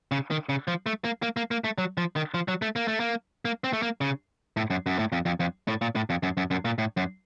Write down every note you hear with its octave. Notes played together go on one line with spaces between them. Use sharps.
C#3
D#3
C#3
F3
A3
A#3
A#3
A#3
A#3
A3
F#3
F3
D#3
F3
F#3
A3
A#3
A3
A#3
A#3
C4
A3
A#3
C#3
A2
F#2
F#2
A2
F2
F2
F2
A2
A#2
A2
F2
F#2
F#2
F#2
A#2
A2
F#2